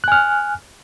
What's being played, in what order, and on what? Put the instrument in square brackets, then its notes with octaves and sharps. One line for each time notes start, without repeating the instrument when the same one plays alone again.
[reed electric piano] F#6
G#5
F6